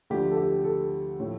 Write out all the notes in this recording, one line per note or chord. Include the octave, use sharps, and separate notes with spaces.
D2 D3 F3 G4
A4
G4
A4
A2 F3